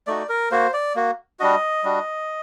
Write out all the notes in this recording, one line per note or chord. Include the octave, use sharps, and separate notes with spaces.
A3 D#4 F#4 D5
A#4
A#3 F#4 C5
D5
A#3 F#4
G3 D4 F#4 D#5
G3 D4 F#4